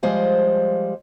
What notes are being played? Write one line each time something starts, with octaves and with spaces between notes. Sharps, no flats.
F3 G3 G#3 C5 F5